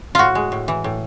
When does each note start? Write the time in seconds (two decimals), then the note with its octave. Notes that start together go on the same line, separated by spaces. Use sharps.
0.15 A2 F4 F#4
0.35 G#3
0.52 A2
0.68 E3
0.84 A2